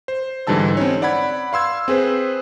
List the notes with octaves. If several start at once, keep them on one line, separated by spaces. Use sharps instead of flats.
C5
G#2 D3 E3 G3 A5 E6
C4 C#4 D#4 C#5
D5 F#5 B5 G#6
F5 C6 E6 G#6
C4 G#4 B4 C5